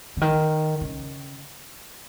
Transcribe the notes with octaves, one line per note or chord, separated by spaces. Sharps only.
D3
D#3
C#3